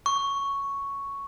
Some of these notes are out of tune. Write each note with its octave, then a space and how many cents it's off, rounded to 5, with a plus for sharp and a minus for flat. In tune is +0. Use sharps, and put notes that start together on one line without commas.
C#6 +5